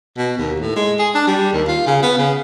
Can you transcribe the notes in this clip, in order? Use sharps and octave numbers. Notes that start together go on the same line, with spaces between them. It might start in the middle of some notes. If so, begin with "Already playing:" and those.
B2
D#2
A2
G#3
G#4
D4
G3
D#2
F4
C#3
B3
C#3